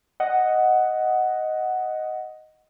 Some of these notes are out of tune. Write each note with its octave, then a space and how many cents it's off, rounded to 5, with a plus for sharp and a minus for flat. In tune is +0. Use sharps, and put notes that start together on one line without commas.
D#5 +0 F#5 +0